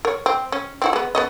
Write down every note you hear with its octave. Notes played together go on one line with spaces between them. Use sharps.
A#4 C#5
C4
C#4
C4 E4 F#4
G#3 B3
B3 C#4 D#5